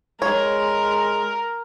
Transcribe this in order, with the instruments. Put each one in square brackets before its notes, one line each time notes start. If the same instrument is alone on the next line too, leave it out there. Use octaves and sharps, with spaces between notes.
[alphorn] G#3 [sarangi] A#4 [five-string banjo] C#5